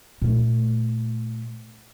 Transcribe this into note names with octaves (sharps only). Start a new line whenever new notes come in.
A#2 A3